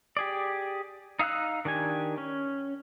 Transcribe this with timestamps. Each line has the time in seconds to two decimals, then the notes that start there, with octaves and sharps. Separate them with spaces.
0.17 G4 G#4 D5
1.19 D#4 F5 G5 E6 F#6
1.65 D#3 D4 G4 G#5
2.18 C#4